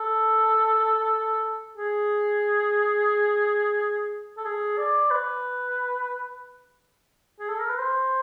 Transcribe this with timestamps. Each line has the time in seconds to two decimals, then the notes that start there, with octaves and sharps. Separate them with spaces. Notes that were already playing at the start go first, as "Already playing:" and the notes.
Already playing: A4
1.77 G#4
4.37 A4
4.45 G#4
4.78 D5
5.11 B4
7.39 G#4
7.49 A4
7.59 A#4
7.69 B4
7.79 C5